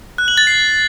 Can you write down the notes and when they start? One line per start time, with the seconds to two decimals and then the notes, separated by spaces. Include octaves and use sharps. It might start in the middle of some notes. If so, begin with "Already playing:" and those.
0.18 F#6
0.28 F#7
0.38 A6
0.47 C7